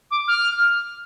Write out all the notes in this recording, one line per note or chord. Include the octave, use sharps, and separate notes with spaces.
D6
F6